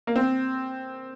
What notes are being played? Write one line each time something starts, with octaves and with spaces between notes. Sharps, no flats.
A#3
C4